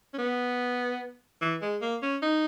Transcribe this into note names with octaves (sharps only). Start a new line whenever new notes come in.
C#4
B3
E3
G#3
A#3
C#4
D#4